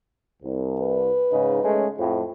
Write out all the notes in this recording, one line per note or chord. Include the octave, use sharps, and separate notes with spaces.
C2
B4
G#2 C#3 D#4
G#3 A3 C#4
F2 A2